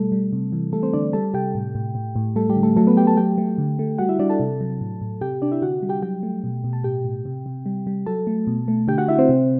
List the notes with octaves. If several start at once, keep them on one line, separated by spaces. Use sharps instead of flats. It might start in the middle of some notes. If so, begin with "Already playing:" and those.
Already playing: B2 G3 A3 A4
G3
C3
E3
G3 A3 A4
C4 C5
D3 D4 D5
G3 A4 A5
C3 G4 G5
A2
A2
A2
A2
G3 A3 A4
G3 G4
D3
A3 A4
F#3 A3 A4
B3 B4
A3 G4 G5
A4 A5
F#3 G4 G5
A3
D3
A3
G3 F#4 F#5
E4 E5
G3 D4 D5
A4 A5
C3
F#3
A2
A2
C3 G4 G5
C3 D4 D5
E4 E5
D3 F#4 F#5
G3
G4 G5
F#3 G4 G5
A3
B2
B2
A5
A2 G4 G5
A2
C3
C3
G3
G3
F#3 A4 A5
A3
B2
A3
D3 G4 G5
F#4 F#5
D3 E4 E5
C4 C5
C3